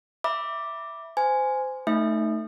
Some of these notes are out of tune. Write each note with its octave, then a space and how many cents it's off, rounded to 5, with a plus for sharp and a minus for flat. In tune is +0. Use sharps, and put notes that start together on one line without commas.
E5 +0 B5 -15 D6 +0
C5 -20 G#5 +0
A3 +0 D#4 +0 E5 -5